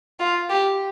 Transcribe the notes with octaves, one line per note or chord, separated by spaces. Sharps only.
F4
G4